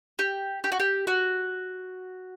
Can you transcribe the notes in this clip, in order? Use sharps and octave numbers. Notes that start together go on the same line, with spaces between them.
G4
G4
F#4
G4
F#4